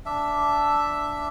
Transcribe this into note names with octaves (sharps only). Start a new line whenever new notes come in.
D4 E5